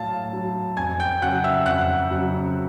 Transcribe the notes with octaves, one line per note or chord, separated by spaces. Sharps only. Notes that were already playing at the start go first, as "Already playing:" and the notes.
Already playing: A2 F#3 F5 A5 A6
F#3
F2 G#5 G#6
G5 G6
C#3 F#3 F#5 F#6
E5 E6
F2 F#5 F#6
C#3 F#3